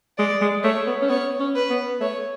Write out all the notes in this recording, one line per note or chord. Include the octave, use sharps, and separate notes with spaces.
G#3 D5
G#3
A3 C#5
B3
C#4
B3 C#5
C#4
B4
B3
A3 C#5